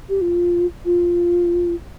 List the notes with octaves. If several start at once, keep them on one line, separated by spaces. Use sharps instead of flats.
G4
F4
F4